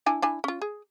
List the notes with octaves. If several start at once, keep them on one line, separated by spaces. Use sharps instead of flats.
D4 E4 G#5
D4 E4 G#5
C#4 F4
G#4